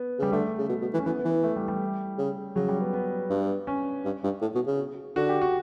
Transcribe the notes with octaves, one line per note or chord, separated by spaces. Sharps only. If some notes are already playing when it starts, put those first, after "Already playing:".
Already playing: B3
C#3 G3
D3 A3
C#3
B2
B2
E3
C#4
E3 B3
B3
E3
B3
A3
G3
G3
C#3
C#3 F#3
G3
B3
B3
G2
C#4
G2
G2
A2
B2
C#3
D3 F#4
G4
F#4